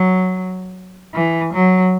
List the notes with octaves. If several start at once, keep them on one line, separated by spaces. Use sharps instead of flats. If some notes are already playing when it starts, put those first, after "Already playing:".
Already playing: F#3
E3
F#3